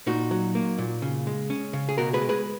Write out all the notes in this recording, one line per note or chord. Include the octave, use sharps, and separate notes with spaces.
A#2 D#4 F#4
F#3
A#3
A#2
C#3
G#3
C#4
C#3
G#4
B2 F#4 A#4
G#4 B4
G#3
G#4 B4